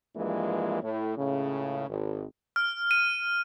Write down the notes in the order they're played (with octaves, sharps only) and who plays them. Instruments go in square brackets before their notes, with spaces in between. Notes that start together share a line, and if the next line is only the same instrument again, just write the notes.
[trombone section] G2 E3 F3 G#3 A#3
A2
C#2 A2 C#3
G#1
[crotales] F6
D#7